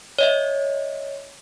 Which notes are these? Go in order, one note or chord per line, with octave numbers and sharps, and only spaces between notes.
C#5 D#5 E5